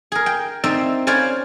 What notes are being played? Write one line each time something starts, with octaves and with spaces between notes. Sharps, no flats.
G#4 A#4
G5
C4 D#4 D5 E5 G5
C#4 C5 D5 F5 G#5 B5